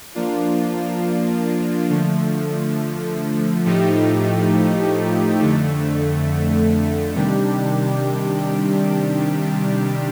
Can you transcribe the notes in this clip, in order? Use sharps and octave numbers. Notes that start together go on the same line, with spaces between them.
F3 A#3 D4 F4
D3 F3 A3
A2 F3 A3 D#4 G4
F2 D3 A3
C3 D#3 G3 D4 G4